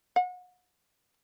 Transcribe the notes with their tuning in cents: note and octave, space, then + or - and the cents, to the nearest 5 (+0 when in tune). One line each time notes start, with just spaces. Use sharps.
F#5 -35